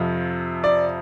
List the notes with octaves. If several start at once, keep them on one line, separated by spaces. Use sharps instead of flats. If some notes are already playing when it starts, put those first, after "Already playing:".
Already playing: F2 C3 F3 C5
D5